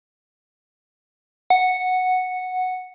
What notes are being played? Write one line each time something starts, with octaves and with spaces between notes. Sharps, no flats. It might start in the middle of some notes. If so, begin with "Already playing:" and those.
F#5